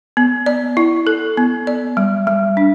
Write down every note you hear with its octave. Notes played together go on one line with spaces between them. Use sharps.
B3
D5
E4
A4
B3
D5
G3
G3
D4